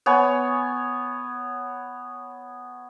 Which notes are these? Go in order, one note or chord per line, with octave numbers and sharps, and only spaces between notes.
B3 C#5 G#5